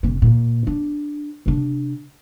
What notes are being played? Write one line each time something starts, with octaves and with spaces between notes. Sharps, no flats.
F1 C#4
A#2
D4
C3 D4